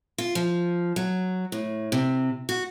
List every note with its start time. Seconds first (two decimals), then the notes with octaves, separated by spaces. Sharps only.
0.18 F4
0.35 F3
0.96 F#3
1.52 A2
1.92 C3
2.49 F#4